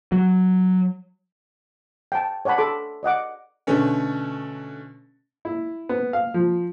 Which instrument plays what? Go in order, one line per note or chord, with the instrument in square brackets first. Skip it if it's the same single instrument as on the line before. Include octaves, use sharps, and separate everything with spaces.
[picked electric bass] F#3
[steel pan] G5 A5
C#5 D5 F#5 A5 B5
A4 B5 C6 D6
D5 D#5 F#5 D6
[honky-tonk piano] B2 D3 A3 C#4
[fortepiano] E4
B3
F5
F3